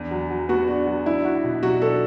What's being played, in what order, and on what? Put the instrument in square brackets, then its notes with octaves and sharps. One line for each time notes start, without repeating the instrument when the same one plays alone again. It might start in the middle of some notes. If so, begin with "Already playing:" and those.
Already playing: [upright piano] E2 D4
F#3
F#3
[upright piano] B3 [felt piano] F#4
[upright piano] D4
F#3
[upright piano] D4 [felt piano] E4
[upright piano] F#4
B2
[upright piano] F#3 [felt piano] F#4
[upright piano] D4 [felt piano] A4